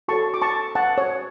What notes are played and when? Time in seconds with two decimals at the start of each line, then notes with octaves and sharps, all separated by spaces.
0.08 F#4 A4 C#5 A5 C#6
0.34 D6
0.42 A5 C#6
0.75 F#5 A5
0.98 C#5